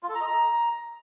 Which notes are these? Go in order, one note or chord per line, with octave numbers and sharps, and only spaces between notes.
F4
A4
A#5
D#5
A#5